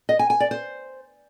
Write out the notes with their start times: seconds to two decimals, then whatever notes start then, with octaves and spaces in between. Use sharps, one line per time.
0.09 D#5
0.19 G#5
0.30 G#5
0.40 D5
0.51 C5